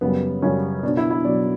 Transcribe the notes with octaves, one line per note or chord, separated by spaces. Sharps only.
F#2 C#3 G3 B3
F#2 C#3 G3 C#4
B2 F#3 D4
E4
E4
B2 F#3 D5